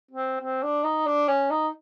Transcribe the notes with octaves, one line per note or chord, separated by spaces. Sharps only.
C4
C4
D4
D#4
D4
C#4
D#4